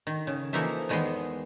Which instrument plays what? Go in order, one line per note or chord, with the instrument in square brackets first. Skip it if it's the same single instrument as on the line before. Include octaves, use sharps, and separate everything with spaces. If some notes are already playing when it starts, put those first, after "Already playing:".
[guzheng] D#3
C#3
E3 F3 A#3 D#4 A4 E5
E2 D#3 G#3 B3 B5 C6